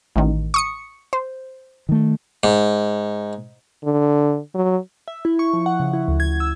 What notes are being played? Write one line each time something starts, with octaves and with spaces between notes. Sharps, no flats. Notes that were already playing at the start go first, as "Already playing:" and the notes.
A1 D#3
C#6 D#6 C#7
C5
D#3 A3
G#2
D3
F#3
E5
E4
C#6
F3
F#5
C#3
E4
D2
G#6
E6